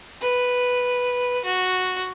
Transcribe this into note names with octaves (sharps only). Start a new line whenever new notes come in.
B4
F#4